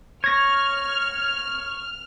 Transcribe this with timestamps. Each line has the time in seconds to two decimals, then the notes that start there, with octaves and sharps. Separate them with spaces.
0.24 C#5 F6 G#6 A#6